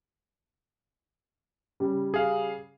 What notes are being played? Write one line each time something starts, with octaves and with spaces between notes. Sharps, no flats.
C#3 G3
G#4 F5